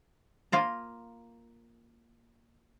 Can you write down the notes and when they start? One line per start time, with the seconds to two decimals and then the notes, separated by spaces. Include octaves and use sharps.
0.52 A#3 F4 A#5